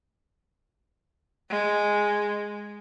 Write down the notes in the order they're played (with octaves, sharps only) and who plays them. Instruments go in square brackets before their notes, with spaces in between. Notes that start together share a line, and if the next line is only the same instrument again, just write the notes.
[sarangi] G#3